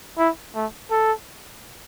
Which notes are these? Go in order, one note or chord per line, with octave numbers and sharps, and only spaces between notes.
E4
A3
A4